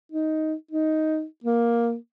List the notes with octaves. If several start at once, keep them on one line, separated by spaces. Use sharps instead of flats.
D#4
D#4
A#3